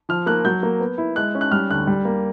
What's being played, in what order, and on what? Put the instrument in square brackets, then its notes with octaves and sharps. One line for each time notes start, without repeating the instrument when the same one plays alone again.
[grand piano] F3 F6
A#3 F#6
F#3 G6
A#3
B3
E4
G#3 F#6
C#4
F#6
G3 F6
D2 F#6
G3
A#3